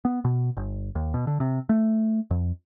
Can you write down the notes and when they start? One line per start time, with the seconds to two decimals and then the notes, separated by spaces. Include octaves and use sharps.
0.05 B3
0.25 B2
0.57 G1
0.95 D#2
1.14 B2
1.27 D3
1.40 C3
1.69 A3
2.31 F2